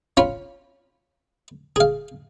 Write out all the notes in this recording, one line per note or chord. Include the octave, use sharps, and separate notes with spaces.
C#4 F4 B5
G#4 F5